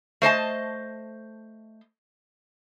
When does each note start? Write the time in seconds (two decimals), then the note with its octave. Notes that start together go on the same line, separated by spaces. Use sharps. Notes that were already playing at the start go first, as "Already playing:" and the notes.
0.22 A3 C5 D#5 A5